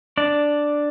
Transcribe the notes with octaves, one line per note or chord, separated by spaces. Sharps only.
D4 D5